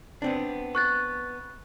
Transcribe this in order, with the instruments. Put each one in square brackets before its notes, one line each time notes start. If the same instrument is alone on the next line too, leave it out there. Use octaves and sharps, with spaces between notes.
[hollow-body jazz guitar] B3 C4 D4
[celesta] C#6 F#6 A6